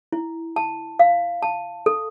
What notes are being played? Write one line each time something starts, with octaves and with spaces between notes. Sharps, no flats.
E4
A5
F5
A5
A4